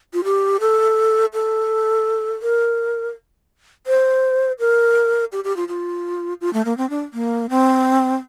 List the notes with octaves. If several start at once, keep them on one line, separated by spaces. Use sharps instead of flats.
F4
G4
A4
A4
A#4
C5
A#4
G4
G4
F4
F4
F4
A3
A#3
C4
D4
A#3
C4